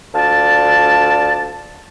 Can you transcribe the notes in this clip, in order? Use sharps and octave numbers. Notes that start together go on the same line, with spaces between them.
D2 F4 D5 A5